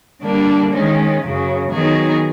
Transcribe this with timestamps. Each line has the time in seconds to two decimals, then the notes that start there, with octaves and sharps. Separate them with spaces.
0.22 D3 G3 A#3 D4
0.72 D#3 G#3 C#4
1.22 F#2 C#3 F#3
1.72 D#3 F#3 B3 D#4 G#4